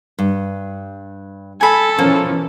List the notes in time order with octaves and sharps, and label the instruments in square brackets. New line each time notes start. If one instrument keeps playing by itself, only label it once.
[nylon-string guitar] G2
[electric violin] A4 [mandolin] G#5 B5
[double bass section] B2 E3 C#4 [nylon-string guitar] F3 [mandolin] A#3